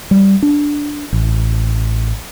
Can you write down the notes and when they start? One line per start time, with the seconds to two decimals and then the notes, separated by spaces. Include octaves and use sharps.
0.11 G3
0.42 D4
1.13 A1